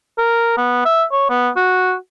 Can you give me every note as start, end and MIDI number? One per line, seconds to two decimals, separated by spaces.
0.18 0.57 70
0.58 0.83 59
0.85 1.04 76
1.12 1.27 73
1.30 1.49 59
1.56 1.95 66